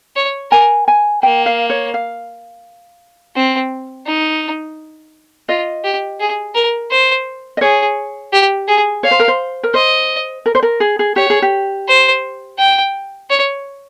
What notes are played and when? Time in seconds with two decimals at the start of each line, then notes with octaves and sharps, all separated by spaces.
0.16 C#5
0.51 A#4 G#5
0.88 G#5
1.23 A#3 G5
1.46 F5
1.70 C#5
1.94 F5
3.35 C4
4.06 D#4
5.49 F4 D#5
5.84 G4
6.20 G#4
6.55 A#4
6.91 C5
7.57 D#5
7.61 G#4 C#5
8.33 G4
8.68 G#4
9.03 C#5 F5
9.11 C5
9.19 A#4
9.28 C5
9.63 A#4
9.74 C5 D#5
10.46 A#4
10.55 C5
10.63 A#4
10.80 G#4
10.99 G#4
11.16 G4 C#5
11.30 G#4
11.42 G4
11.88 C5
12.58 G5
13.30 C#5